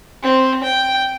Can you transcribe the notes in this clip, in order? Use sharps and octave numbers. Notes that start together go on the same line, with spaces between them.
C4
G5